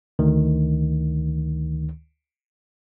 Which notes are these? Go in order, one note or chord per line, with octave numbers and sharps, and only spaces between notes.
D2 D#3